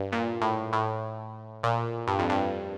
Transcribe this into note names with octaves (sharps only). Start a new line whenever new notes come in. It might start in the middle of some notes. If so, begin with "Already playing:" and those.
Already playing: G2
A#2
A2
A2
A#2
G2
F2
G2